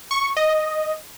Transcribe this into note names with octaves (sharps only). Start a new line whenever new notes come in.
C#6
D#5